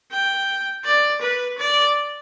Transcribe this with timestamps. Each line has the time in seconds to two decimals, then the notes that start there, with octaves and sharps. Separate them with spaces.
0.12 G5
0.85 D5
1.22 B4
1.58 D5